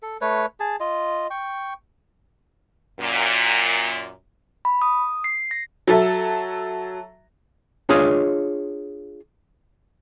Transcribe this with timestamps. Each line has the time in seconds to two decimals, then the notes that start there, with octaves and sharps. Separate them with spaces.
0.02 A4
0.21 A3 B4 C#5
0.60 G#4 A5
0.80 F4 D#5
1.30 G5 C#6
3.00 F#2 A#2
4.65 B5
4.82 D#6
5.24 C7
5.51 A#6
5.87 F#3 A4 E5
7.89 D4 F4 G#4 C#5 D#5